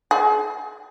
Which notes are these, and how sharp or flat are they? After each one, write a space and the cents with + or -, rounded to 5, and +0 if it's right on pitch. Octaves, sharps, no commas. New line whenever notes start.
G#4 +45